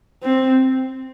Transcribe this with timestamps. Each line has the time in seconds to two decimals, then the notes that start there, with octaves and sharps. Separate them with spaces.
0.23 C4